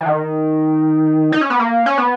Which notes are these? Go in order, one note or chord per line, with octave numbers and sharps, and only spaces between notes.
E3
D#3
D#4
C#4
B3
A#3
C#4
B3